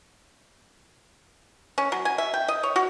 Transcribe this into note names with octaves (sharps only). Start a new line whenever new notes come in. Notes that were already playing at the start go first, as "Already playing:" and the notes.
C#4
F#3
G#5
E5
G5
D#5
C#5
F#4